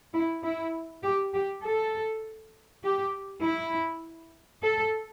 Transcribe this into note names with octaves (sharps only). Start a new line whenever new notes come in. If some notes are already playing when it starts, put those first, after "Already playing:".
E4
E4
G4
G4
A4
G4
E4
A4